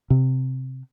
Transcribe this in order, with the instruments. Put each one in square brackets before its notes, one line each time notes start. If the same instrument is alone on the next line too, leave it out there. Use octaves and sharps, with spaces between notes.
[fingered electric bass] C3